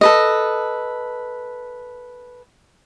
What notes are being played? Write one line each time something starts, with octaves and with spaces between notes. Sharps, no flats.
A4 B4 D#5